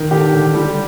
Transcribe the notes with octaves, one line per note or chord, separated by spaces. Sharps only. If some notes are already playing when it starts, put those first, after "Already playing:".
Already playing: D#3
D3 G4 G5
D3
G3